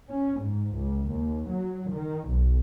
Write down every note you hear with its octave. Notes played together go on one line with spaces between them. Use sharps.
C#4
G#2
C#2
D#2
F#3
D#3
B1